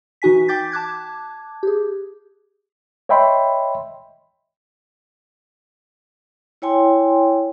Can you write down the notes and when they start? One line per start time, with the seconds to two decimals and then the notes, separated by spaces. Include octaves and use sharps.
0.22 E3 D#4 F#4 G#5 B6
0.48 G5 D6 G6 A6 B6
0.72 A5 D6 F#6 G#6
1.63 G4 G#4
3.09 C#5 D#5 E5 G5 B5 C6
6.62 E4 C#5 G5 G#5 C6